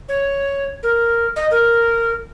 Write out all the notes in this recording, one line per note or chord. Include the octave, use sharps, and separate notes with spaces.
C#5
A#4
D#5
A#4